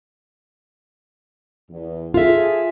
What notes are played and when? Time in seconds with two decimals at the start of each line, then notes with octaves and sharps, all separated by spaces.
1.70 E2
2.14 F4 G#4 A4 E5